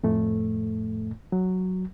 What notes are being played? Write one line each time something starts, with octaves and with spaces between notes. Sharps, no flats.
F2 A2 A3
F#3